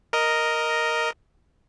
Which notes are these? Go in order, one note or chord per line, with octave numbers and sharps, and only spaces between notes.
A#4 D#5